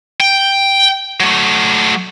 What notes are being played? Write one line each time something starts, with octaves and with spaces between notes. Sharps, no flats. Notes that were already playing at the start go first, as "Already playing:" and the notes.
G5
F#3 A3